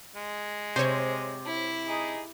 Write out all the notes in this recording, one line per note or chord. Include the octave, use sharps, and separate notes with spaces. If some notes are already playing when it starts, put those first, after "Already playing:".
G#3
C3 C5 C#5
E4
D#4 G#4